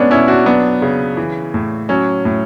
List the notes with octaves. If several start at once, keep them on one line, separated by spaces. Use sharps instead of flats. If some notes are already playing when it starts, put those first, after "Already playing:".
Already playing: A2 G#3 B3 C#4 D4
B2 C#4 E4
D4 F#4
F#3 B3 D4
C#3
E3
A2
F#3 C#4
A2